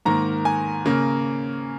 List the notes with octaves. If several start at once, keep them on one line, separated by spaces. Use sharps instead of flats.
G#2 D#3 A#3 A#5
G#5
C#3 A#3